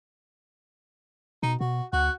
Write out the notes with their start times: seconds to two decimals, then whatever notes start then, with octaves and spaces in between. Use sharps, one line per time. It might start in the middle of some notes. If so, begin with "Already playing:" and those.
1.43 B2 D#4
1.61 B2 F#4
1.93 D2 F#4 F#5